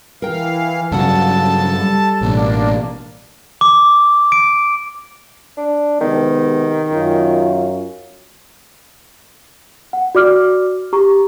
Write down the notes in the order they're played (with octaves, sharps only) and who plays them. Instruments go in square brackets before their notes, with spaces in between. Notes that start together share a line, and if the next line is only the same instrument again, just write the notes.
[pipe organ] E3 F5 [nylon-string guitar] A#4 G5
[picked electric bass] G2 C#3 F#3 [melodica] A4 [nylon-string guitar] F5 F#5 [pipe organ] A5
[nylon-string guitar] G3
[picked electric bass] A1 B2 [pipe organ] A#3 D4
[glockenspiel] D6
D7
[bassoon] D4
[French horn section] C3 G#3 B3 [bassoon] D#3
[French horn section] F#2 C#4 F4
[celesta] F#5
F#4 D5 D6 F6
G4 A#5 C#6